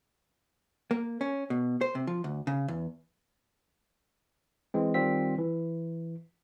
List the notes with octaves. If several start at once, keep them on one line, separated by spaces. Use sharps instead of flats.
A#3
C#4
B2
C5
C3
F3
D2
C#3
E2
E3 G#3 C4
D#3 G3 C4 F4 B6
E3